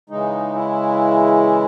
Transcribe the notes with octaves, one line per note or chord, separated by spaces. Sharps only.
C#3 E3 G#3 D#4
E4